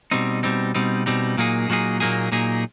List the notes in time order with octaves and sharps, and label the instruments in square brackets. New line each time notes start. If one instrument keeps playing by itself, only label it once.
[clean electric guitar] B2 G3 C4 D#4
B2 G3 C4 D#4
B2 G3 C4 D#4
B2 G3 C4 D#4
A#2 F#3 A#3 D#4 G#4
A#2 F#3 A#3 D#4 G#4
A#2 F#3 A#3 D#4 G#4
A#2 F#3 A#3 D#4 G#4